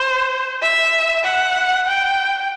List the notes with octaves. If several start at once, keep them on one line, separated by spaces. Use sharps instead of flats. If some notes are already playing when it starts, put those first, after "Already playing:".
Already playing: C5
E5
F#5
G5